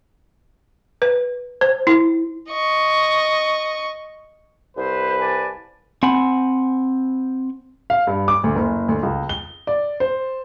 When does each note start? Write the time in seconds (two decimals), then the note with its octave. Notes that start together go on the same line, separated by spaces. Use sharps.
1.02 B4
1.61 C5
1.87 E4
2.51 D#5 C#6
4.77 C2 B4 C5
5.20 D5 G#5 A5
6.03 C4 F#5 G#5 B5
7.90 F5
8.07 G2
8.28 D6
8.44 D2
8.56 F#1
8.88 D2
9.03 C#2
9.29 G7
9.67 D5
10.00 C5